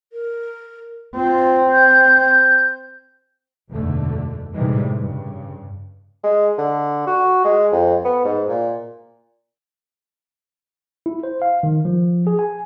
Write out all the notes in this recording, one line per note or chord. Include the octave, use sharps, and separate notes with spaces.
A#4
C4 F4
G6
F#1 E2 G#2 B2 D3 A3
A2 C3 D#3 E3 G3 G#3
G2 C#3
G#3
D3
F#4
G#3
F2
B3
G#2
A#2
E4
C5
F5
D#3
F3
G#4
G#5